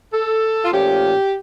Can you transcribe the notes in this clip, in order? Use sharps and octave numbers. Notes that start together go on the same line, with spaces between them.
A4
F4
A#2 F3 A3 C#4 G4